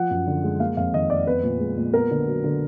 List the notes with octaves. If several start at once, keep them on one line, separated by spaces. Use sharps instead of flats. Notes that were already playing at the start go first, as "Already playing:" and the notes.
Already playing: F3 F#5
F#2
D3
G#3
A#3 F5
F2 F5
D#3 D#5
F2 D5
B3 B4
A#2
G#3
A#2
B3 A#4
D3
F#3
D3